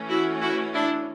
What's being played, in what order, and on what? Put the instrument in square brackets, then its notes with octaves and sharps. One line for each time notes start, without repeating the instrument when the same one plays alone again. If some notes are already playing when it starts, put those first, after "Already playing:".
Already playing: [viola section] E3 A3 C#4
E4 F#4
E4 F#4
D4 E4